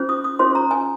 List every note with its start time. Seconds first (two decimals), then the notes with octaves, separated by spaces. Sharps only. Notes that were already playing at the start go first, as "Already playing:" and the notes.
Already playing: C#4 F4 G#4 C5
0.09 D#6
0.24 D#6
0.39 C#4 F4 G#4 C5 C6
0.55 A#5
0.71 G#5